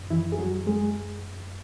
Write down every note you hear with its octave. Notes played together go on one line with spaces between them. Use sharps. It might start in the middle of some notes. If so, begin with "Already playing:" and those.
Already playing: F#2
E3 E4
G#4
F#3 F#4
G#3 G#4